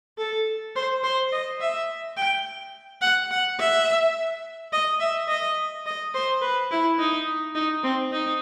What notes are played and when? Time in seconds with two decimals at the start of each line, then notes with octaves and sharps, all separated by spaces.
0.18 A4
0.76 C5
1.03 C5
1.32 D#5
1.60 E5
2.17 G5
3.02 F#5
3.31 F#5
3.59 E5
4.72 D#5
5.00 E5
5.28 D#5
5.86 D#5
6.14 C5
6.42 B4
6.71 E4
6.99 D#4
7.55 D#4
7.83 C4
8.12 D#4